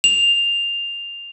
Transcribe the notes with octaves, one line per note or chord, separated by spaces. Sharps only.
F7